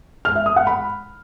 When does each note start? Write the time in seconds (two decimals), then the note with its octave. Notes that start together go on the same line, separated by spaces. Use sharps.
0.25 F6
0.35 E5
0.46 D#6
0.56 F#5
0.67 B5